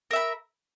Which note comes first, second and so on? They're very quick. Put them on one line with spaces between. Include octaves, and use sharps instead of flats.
A#4 E5 B5